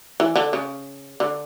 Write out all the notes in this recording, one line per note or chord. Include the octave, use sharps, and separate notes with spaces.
E3
D3
C#3
D3